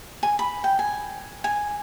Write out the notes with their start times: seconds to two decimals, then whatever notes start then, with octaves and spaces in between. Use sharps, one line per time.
0.23 G#5
0.39 B5
0.64 G5
0.79 G#5
1.44 G#5